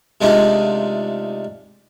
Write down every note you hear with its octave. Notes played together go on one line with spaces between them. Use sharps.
C3 G#3 A3 D4 D#4 F4